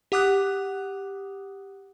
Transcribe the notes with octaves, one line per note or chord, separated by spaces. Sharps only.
G4 F#5 D6 D#6 F#6